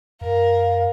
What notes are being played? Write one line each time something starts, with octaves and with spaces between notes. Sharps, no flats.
F#2 A#4 F5